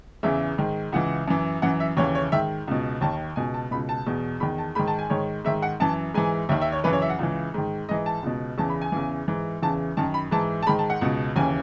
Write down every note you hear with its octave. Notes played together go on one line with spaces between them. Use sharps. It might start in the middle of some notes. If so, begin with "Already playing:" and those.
E2 C#3 E3 E5
G#2 D#3
C#2 C#3 E3 F#5
F#2 E3
F#2 E3 F#5
E5
D#2 C#3 E3 C#5
C#5
G#2 D#3 E5
C#2 B2
D#2 D#3 A5
C#2 B2 G#5
A5
C#2 B2 B5
A5
E2 B2
E2 D#3 B5
A5
G#2 D#3 B5
A5
G#5
G#2 D#3 C#5
G#2 D#3 E5
F#5
F#2 E3 A5
G#2 E3 G#5
D#2 D#3 E5
E5
C#5
F#2 C#3 E3 B4
C#5
E5
F#5
C#2 C#3 E3
G#2 D#3
G#2 E3 D#5
A5
C#2 B2
E2 C#3 E3 A5
B5
G#5
E2 C#3 E3
G#2 E3
E2 C#3 E3 A5
F#2 D#3 A5
B5
G#2 E3 A5
A5
G#2 D#3 B5
A5
F#5
C#2 B2
D#2 C#3 E3 G#5